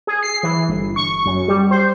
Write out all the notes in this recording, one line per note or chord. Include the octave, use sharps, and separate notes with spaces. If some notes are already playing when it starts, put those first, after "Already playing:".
G#4
C7
E3
G1
C#6
F#2
G3
C5